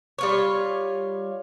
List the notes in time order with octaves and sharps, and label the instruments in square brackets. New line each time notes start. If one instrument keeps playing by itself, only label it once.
[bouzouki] G3 F4 C#5